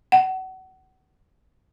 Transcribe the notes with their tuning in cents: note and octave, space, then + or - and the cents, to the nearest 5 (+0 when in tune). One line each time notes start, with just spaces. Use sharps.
F#5 +30